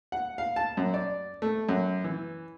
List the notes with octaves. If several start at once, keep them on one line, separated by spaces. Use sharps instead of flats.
F#5
F5
A5
F#2
D5
A3
F#2
E3